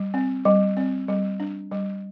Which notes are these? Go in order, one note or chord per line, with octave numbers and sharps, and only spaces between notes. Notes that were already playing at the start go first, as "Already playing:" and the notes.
Already playing: G3
C4
G3
C4
G3
D4
G3